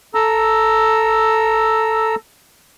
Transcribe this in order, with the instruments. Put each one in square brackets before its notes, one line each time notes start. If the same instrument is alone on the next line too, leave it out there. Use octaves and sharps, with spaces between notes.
[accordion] A4 A#5 E6